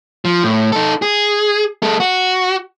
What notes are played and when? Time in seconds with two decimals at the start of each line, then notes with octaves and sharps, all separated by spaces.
0.25 F3
0.43 A2
0.72 D#4 A4
1.02 G#4
1.83 G#3 A4
2.00 F#4